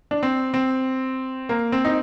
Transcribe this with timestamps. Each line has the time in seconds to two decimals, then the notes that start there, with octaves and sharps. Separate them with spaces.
0.11 D4
0.23 C4
0.54 C4
1.49 A#3
1.72 C4
1.85 D#4